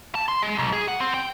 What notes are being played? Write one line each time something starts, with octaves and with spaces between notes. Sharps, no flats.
A5
C6
G#3
B1
G#4
F#5
C4
G5